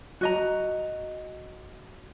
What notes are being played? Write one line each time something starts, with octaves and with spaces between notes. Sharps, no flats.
F#4 D#5 A#5